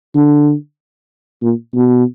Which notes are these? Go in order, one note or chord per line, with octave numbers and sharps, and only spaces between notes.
D3
A#2
B2